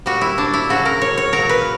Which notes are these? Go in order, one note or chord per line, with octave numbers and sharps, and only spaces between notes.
A#2 G3 F#4
E4
D4
E4
C#3 F#3 F#4
A#4
C#5
C#5
A#2 F#3 A#4
B4